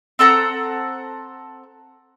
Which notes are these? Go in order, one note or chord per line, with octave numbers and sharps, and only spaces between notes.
C4 A4 F#5 A#5